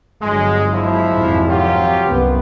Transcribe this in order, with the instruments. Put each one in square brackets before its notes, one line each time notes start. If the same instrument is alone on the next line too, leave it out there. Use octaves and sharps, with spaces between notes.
[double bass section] G1 F#3 [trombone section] G#3
[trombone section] F3 G#3 E4
[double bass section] G#1 F2 C3
[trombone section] F#3 F4 G4
[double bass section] C2 F#2 B3